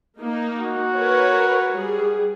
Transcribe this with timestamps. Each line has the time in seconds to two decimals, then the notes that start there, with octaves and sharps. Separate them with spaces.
0.19 A#3 D#4
0.58 F#4
0.94 A#4 B4 C#5
1.74 G3 G#4